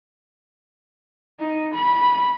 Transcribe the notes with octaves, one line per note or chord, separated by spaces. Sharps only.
D#4
B5